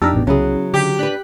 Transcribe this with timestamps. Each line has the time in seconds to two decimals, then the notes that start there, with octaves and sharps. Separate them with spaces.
0.02 F2 D4 D#4 G4 A4 A#4 E5
0.13 A1 B2
0.27 C2 C#3 F#3 B3 E4 G#4
0.74 D3 G4
0.99 D4 B4 F#6 B6